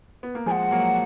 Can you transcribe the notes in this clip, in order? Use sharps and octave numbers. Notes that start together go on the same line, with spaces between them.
B3
A#3
F3 G#3 G#5
F#5
F#3 A#3